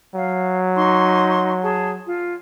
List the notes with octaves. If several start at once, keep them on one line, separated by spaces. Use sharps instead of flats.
F#3 F5
D#4 C6 C#6
G#4 A5
F4